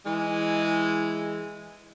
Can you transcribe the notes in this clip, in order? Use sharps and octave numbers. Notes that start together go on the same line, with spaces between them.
E3 G#3